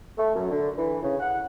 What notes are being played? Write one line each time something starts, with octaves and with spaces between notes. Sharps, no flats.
A3
F#2
D3
E3
C#3
F#5